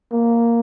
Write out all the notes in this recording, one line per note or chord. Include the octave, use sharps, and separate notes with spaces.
A#3